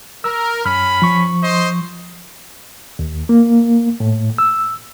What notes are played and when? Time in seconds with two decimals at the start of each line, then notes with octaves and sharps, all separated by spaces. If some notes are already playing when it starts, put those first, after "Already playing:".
0.24 A#4 E6
0.65 F#2 C#4 B5 F6
1.02 F3 C#6
1.43 C5 D#5 C6
2.99 D#2
3.29 A#3
4.00 A2
4.38 E6